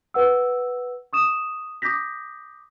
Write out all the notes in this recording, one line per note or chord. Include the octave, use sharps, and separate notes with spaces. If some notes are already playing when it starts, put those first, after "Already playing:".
B4 F#5 E6
C#6 D#6 E7
D6 D#6 G6 A#6 B6